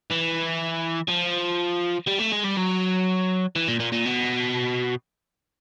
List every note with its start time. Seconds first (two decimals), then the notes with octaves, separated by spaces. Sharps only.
0.10 E3
1.09 F3
2.08 G3
2.20 A3
2.33 G#3
2.44 G3
2.57 F#3
3.56 E3
3.68 A#2
3.80 A#2
3.92 A#2
4.05 B2